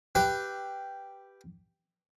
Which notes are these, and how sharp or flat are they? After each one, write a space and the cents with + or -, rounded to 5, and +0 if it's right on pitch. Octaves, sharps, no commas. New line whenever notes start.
G4 +0 B4 +0 F5 -35